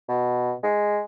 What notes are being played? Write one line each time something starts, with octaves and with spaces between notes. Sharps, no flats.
B2
G#3